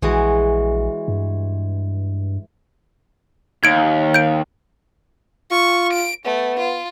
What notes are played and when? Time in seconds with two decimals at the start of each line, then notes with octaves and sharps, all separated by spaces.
0.02 A#1 E3 G#3 F#4
1.08 G2
3.64 D#2 G#6 D7
4.14 G6 D7
5.51 F4 C#6
5.93 D7
6.26 A3 B3
6.59 F4